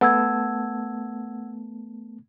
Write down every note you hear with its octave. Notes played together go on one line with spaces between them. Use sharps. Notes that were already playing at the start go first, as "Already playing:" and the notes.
A3 B3 F#5 A5 E6 G#6